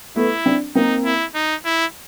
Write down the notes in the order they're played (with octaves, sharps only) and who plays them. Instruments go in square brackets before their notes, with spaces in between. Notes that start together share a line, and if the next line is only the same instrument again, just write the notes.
[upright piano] A3 B3 [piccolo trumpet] E4
[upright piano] C4 D4
[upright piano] A#3 C4 [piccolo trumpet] D#4
[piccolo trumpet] E4
D#4
E4